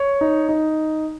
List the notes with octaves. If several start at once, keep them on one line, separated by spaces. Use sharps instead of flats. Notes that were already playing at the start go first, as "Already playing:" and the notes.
Already playing: C#5
D#4
D#4